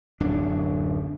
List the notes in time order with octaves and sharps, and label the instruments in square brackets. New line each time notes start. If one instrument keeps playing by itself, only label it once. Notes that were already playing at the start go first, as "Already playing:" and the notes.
[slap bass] D1 F#2 D4